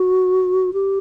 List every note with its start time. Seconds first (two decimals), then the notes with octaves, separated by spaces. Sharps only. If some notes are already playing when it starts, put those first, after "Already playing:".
Already playing: F#4
0.73 G4